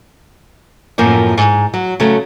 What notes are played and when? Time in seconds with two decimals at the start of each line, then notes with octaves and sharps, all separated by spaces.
0.98 F#2 A2 F3 A#3 C4
1.37 G#2
1.74 F#3
2.00 C#3 F#3 A3